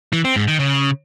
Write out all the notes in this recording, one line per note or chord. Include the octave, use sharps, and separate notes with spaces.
E3
C4
G#2
D#3
C#3